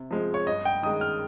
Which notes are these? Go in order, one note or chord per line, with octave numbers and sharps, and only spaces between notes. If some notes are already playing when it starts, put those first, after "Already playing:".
Already playing: C3
F3 G#3 C4
C#5
G2 D#5
G5
D#3 G#3 D#6
F6